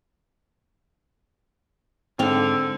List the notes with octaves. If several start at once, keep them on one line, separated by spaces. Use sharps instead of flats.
G#2 D3 C4 F5